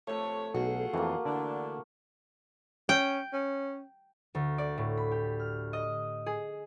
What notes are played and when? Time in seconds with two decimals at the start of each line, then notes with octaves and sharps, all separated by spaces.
0.07 F2 C3 A3 A4 C#5
0.54 B1 E2 F4 F#4 G#4
0.94 F2 E3 A3 A#3
1.25 D3 E3 D4
2.89 C#4 G5
3.33 C#4
4.35 D2
4.58 D5
4.78 A2
4.97 B5
5.11 G4
5.39 F6
5.73 D#5
6.26 G#4